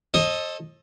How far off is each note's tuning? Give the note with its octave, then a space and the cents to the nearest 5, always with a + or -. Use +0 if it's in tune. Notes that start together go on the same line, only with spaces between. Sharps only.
A4 +0 C5 +40 D#5 +0